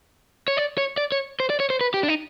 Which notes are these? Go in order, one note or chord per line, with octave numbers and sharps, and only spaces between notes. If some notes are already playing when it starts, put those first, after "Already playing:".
C#5
D5
C#5
D5
C#5
C5
D5
C#5
C5
B4
G4
D4
D#4